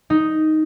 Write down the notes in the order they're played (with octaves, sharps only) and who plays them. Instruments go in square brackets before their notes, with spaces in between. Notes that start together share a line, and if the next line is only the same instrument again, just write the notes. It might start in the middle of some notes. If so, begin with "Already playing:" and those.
[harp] D#4